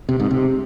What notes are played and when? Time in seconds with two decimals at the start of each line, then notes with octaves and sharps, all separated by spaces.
0.09 C3
0.20 G#2
0.31 C3